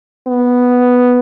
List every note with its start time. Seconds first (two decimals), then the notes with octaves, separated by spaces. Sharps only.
0.27 B3